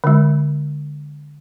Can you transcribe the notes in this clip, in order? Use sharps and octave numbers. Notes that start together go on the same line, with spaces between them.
D3 G#3